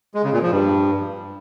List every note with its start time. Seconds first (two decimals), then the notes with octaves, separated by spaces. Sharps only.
0.14 G#3
0.24 C#3
0.33 A#2
0.42 F3
0.51 G2